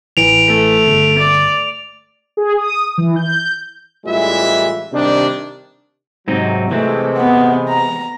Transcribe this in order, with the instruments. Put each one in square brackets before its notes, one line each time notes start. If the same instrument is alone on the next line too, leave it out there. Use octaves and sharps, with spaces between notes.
[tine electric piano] A1 E3 [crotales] D7 F7
[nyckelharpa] A3
[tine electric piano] G1
[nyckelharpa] D5
[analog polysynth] G#4
D#6
E3
G6
[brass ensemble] A1 E3 G3 G#3 F4 E5
C3 D#3 G3 D4
[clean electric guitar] G#2 C4 D#4 [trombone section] C3 F#3
[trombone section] C3 G#3 [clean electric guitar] E3 C4 [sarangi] A3
[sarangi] B3
A#5